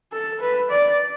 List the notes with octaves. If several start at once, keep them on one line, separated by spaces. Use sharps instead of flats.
A4
B4
D5